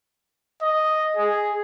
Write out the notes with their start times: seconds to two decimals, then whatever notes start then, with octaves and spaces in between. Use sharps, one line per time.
0.62 D#5
1.17 G#4